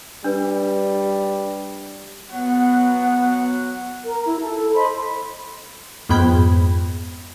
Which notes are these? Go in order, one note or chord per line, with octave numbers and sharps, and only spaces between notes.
G3 D4 B4
F#3 B3 F#5
A#4
E4
A4
C5 D#5 B5 C6
F2 G#2 B3 G5 B5 G#6